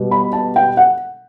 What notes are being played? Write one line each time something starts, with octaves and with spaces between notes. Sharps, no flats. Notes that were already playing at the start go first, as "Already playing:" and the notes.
Already playing: B2 G3
B5
A5
G5
F#5